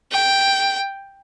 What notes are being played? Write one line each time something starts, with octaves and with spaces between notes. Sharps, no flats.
G5